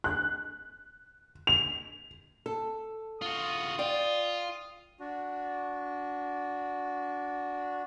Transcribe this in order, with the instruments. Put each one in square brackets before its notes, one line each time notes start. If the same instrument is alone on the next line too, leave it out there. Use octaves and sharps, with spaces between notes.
[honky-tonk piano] F#6
F7
[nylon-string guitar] A4
[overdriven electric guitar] F4 F#4 [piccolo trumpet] D#6
[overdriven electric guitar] F4 [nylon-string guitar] D5 G5
[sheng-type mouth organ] D4 F#4